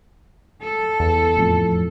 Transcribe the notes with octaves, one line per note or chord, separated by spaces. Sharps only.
A4
E2
F2 A2